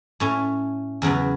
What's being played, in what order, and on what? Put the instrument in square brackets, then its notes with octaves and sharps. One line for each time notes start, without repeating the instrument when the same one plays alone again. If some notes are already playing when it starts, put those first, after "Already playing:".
[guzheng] A2 A3 C#4
E2 C#3 F#3 B3